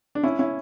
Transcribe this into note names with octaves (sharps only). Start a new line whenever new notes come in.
D4
C#4 E4
C#4 E4